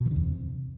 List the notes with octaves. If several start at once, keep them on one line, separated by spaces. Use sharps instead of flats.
B2
E3
D3
E2
C3